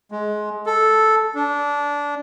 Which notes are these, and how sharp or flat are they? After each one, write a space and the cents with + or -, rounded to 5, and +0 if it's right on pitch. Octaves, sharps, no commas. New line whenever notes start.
G#3 +20
A4 -5
D4 -20